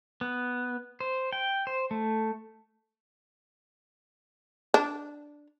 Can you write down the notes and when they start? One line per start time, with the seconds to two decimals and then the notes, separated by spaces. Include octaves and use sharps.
0.21 B3
1.00 C5
1.33 G5
1.67 C5
1.91 A3
4.74 D4